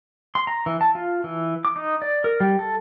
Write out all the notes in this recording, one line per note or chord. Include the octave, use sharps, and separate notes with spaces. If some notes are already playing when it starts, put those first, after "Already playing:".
C6
A#5
E3
A5
F4
E3
D6
D#4
D5
A#4
G3
A4